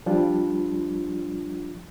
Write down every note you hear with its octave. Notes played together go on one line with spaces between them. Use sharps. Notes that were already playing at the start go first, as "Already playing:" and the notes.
F3 G3 D4 F4